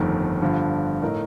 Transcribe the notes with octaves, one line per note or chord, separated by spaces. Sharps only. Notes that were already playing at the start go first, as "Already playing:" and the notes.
Already playing: G1 F2 D#3 A3
G2 D3 F3
A2 A3 D#4 A#4 D#5